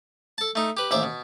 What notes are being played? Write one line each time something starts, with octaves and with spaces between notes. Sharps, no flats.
A4 A5
A3 D#4
G4 B4
A1 D#2 C5 E5 D6
B2